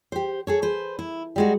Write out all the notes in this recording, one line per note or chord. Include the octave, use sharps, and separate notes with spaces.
G4 C5
G#4 A4 C#5
B4 C5
E4
G3 G#3 F#4